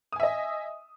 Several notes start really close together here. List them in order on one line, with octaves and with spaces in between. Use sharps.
D#6 G#5 E5 D#5